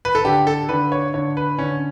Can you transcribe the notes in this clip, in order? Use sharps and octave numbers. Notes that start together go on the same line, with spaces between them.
B4
A4
D3 G4
A4
D3 B4
C#5
D3 C#5
B4
D3 C#4